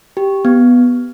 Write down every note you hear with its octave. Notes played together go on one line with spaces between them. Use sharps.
G4
B3